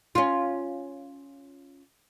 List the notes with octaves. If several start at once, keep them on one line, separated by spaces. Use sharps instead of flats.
C#4 F4